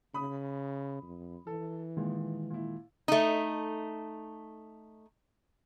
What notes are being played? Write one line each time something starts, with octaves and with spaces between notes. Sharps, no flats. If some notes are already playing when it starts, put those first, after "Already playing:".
C#3 B5 D#6
F2
E3 A4
A#2 D#3 G#3
A#2 E4
A3 D#4